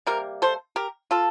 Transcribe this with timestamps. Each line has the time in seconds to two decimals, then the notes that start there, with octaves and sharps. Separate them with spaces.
0.06 C3 G3 A#3 A#4
0.42 A4 C5
0.76 G4 A#4
1.11 F4 A4